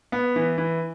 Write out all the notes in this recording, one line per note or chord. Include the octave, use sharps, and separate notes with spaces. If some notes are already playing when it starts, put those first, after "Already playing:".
B3
E3
E3